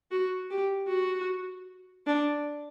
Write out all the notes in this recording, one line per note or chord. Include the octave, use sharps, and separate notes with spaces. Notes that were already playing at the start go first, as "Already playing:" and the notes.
F#4
G4
F#4
D4